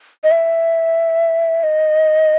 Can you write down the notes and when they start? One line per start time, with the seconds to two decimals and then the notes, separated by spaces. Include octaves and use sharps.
0.24 D#5
0.31 E5
1.63 D#5